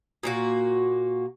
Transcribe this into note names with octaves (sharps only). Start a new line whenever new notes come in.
A#2 A#3 F#4